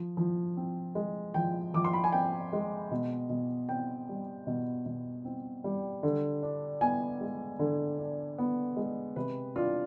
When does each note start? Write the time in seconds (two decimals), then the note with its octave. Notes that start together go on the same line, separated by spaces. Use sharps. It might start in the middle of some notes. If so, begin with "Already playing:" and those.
Already playing: F3
0.17 F3
0.57 C4
0.95 G#3
1.34 F3 G5
1.74 F3 D6
1.85 C6
1.93 B5
2.04 G#5
2.12 C4 G5
2.53 G#3
2.91 B2
3.30 B2
3.69 C4 G5
4.09 G3
4.47 B2
4.86 B2
5.25 C4
5.64 G3
6.03 D3
6.43 D4
6.81 B3 G#5
7.21 G#3
7.59 D3
7.98 D4
8.38 B3
8.76 G#3
9.16 C3 B4
9.56 D4 F4